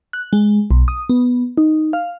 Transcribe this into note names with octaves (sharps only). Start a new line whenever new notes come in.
F#6
G#3
B1
D#6
B3
D#4
F5